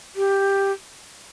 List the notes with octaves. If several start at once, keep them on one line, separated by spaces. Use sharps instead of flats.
G4